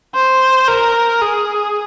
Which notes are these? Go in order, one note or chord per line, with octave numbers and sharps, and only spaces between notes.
C5
A#4
G#4